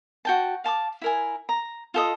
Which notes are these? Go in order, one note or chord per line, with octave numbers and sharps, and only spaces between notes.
F#4 G5 A5
F5 A5 C6 D6
E4 A#4 G#5
A#5
F4 A4 D#5